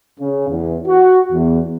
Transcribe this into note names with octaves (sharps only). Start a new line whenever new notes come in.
C#3
E2
F#4
E2